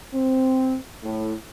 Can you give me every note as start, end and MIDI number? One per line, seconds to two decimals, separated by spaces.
0.14 0.76 60
1.03 1.33 45